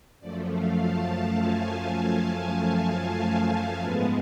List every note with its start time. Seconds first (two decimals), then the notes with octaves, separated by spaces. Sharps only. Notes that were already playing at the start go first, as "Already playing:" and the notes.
0.20 F#2 F3 A3 D5
0.50 F5
0.79 A5
1.40 G#5
1.70 A5
2.90 A5
3.80 G#2 G#3 B3 B4